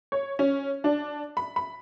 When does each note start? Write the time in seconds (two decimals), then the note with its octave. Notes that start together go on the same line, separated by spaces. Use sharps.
0.12 C#5
0.39 C#4
0.84 D4
1.37 B5
1.56 B5